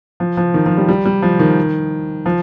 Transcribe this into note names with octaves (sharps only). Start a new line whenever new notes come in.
F3
F3
D#3
F3
G3
G3
G3
F3
D#3
F3